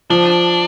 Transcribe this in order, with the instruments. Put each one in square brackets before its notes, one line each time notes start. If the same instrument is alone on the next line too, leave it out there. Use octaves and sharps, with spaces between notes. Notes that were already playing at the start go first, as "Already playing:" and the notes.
[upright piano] F3 [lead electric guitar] D4